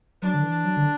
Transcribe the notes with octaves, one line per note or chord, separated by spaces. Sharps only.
F#3 D4
D3
E3
F#3
D3